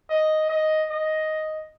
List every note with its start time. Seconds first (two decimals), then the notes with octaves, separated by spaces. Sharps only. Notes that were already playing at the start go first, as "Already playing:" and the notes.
0.10 D#5
0.49 D#5
0.90 D#5